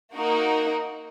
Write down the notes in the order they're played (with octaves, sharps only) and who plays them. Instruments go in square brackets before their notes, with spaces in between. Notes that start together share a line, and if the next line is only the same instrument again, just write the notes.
[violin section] A#3 D#4 F#4 A#4